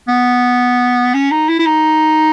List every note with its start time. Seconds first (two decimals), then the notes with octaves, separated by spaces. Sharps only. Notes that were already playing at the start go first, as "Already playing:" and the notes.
0.08 B3
1.14 C#4
1.31 D#4
1.49 E4
1.59 E4
1.66 D#4